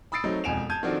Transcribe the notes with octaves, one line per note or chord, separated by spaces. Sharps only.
B5 D#6 E6 A6 C7 D7
F#3 A3 C4 D#4
E1 F2 G#5 D7 E7 F7
A5 G6 G#6 D#7
D#3 F3 C4 D4 F#4 A4